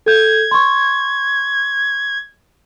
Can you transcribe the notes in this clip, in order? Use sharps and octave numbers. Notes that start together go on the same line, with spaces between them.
A4 G6 G#6
C6 C#6